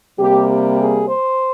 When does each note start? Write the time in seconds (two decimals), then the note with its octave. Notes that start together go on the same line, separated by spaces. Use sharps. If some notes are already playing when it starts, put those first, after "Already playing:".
0.19 C3 G3 A#3 G4
0.49 G4
0.79 G#4
1.08 C5